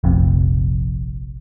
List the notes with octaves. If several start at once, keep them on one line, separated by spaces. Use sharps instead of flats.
F1 A#1 F2 C3